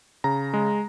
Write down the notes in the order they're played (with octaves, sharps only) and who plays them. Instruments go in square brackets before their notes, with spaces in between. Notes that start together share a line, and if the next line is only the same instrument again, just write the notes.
[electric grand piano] C#3 A#5
G#3